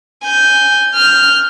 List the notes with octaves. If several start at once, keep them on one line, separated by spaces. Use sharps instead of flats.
G#5 G6
F6 G6